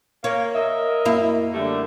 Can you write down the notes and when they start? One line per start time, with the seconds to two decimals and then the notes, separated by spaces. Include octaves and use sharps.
0.24 A#3 C#5
0.55 A#4 D#5 E5
1.05 F#2 A#3 E4
1.53 D3 G3 A3